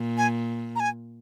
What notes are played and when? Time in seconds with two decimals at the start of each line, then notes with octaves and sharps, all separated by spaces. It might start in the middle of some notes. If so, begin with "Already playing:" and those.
Already playing: A#2
0.18 G#5
0.76 A#5
0.80 G#5